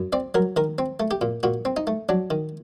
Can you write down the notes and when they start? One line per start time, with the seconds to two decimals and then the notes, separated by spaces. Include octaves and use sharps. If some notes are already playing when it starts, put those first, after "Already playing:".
Already playing: F#2
0.13 C4 D5
0.35 F#3 A#4
0.56 D#3 A#4
0.78 C4
1.00 A3
1.11 G4
1.21 A#2
1.43 A#2 F#4
1.65 C4
1.77 D#4
1.87 A3
2.09 F#3 D4
2.30 D#3